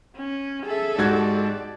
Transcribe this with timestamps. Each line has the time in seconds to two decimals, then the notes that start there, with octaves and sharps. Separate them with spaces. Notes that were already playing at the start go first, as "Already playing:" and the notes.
0.16 C#4
0.66 G#4 A4 E5
0.98 G#2 F#4 G4 D5 G#6